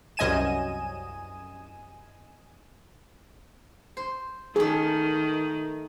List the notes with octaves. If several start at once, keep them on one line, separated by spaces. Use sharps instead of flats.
C2 F#2 D#5 G#5 D#7 E7
C5
D#3 A3 A#3 G#4